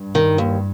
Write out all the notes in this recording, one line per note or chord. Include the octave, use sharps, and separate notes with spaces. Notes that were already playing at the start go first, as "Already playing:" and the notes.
Already playing: G2
D#3
D#2